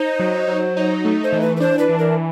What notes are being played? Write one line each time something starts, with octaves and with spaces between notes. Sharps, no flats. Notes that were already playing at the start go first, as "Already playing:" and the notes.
Already playing: D#4 C5
F#3
F#3
D#4
A3
C5
E3
B4
B4
D4 C5
B4
E3
A#4